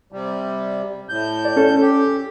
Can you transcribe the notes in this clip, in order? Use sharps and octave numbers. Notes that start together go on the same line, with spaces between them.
C3 G3
A2 G6
D5
C#4 A4
G4